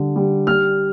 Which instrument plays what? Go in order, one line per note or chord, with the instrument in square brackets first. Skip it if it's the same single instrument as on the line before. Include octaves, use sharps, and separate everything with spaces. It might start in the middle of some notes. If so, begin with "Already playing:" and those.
Already playing: [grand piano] D3 G3
G3
G3 F6